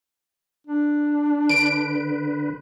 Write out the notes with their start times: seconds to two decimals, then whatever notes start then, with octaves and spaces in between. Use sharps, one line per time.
0.67 D4
1.49 D3 B4 D7